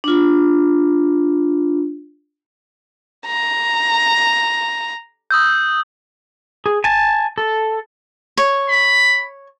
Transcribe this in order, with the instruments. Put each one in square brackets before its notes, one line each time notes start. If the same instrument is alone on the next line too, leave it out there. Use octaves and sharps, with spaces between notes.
[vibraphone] D4 F4
[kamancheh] A#5
[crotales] D#6 E6 G6
[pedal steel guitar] G#4
G#5 A5
A4
[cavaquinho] C#5
[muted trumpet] B5